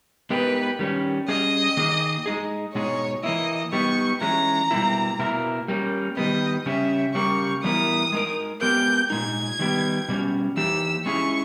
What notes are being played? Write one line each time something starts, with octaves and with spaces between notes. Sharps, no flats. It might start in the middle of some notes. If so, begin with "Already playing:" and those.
G#3 B3 D#4 G4 A#4 B4
D#3 G3 A#3 C#4
G3 C#4 G#4 D#5
D#3 A#3 D#4 G#4
G#3 D#4 G#4
B2 G#3 D#4 G#4 C#5
E3 A#3 E4 D#5
G3 B3 D#4 C#6
E3 G#3 C#4 A#5
B2 G3 A#3 E4
B2 A#3 E4 A#4
G3 A#3 C#4
D#3 G3 B3 D#5
C#3 G3 C#4 E5
C#3 G3 A#3 C#6
E3 G3 B3 E4 A#4 D#6
G#3 D#4 A#4
G#3 B3 G4 A#4 G6
A#2 G#3 D#4 G#6
D#3 G3 B3
B2 G3 C#4
E3 A#3 D#4 G4 E6
G#3 C#4 E4 G#4 C#6